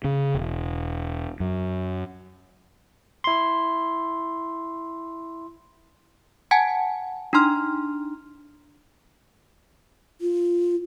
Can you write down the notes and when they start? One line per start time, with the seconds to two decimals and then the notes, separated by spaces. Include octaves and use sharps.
0.04 C#3
0.34 E1
1.40 F#2
3.24 E4 C6
6.51 F#5 G#5 A5 G#6
7.33 D4 D#4 A#5 C6 F6
10.21 F4